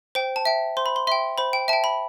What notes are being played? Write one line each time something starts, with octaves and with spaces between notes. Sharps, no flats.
C5 G5
A5
E5 G5
C5 C6
B5
C6
E5 G5 C6
C5 B5
G5
E5 A5
G5
B5